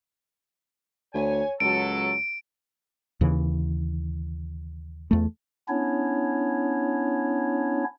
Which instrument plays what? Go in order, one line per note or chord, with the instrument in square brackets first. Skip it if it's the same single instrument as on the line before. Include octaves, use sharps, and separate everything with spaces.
[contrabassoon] D2 [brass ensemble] C#5 G#5
[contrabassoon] C#2 [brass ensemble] F#3 A4 [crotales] D7
[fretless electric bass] D#2 C#3 E3
E2 A3
[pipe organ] B3 C#4 D4 E4 C#5